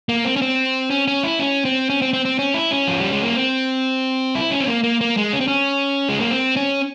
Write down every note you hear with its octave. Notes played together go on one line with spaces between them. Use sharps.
A#3
C4
C#4
C4
C#4
C#4
E4
C#4
C4
C#4
C4
C4
C4
C#4
E4
C#4
F3
G3
G#3
A#3
C4
E4
C#4
C4
A#3
A#3
A#3
G#3
C#4
C4
C#4
G#3
A#3
C4
C#4